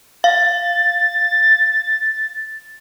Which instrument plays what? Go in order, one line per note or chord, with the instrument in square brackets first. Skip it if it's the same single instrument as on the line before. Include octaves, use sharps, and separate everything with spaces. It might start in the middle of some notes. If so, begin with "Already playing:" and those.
[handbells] F5 [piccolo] A6